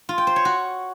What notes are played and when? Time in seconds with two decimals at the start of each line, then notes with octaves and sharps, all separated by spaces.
0.09 F4
0.18 G5
0.27 C5
0.36 C#5
0.45 F#4